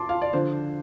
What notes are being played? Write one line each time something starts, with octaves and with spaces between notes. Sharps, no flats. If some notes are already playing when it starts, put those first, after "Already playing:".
Already playing: A5 C6 D6
F5
D5
D3 F3 D4 C5